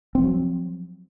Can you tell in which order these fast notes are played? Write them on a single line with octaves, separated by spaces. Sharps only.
C4 F3 F#3